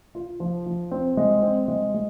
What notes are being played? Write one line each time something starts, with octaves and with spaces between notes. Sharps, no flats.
F4
F3
F3
C4
G#3
C4
G#3
G#3